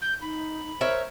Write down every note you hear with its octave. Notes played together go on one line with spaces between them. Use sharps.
G6
D#4 B5
A#4 C5 C#5 E5